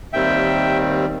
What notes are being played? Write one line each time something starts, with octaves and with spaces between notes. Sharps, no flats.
D#2 D#3 G3 C4 E5 G5